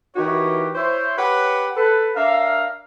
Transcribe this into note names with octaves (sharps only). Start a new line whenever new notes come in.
E3 D#4 F#4 G4 A#4 C#5
E4 C5 C#5
G4 B4 C#5 F#5
A4 B4
D4 A#4 E5 F5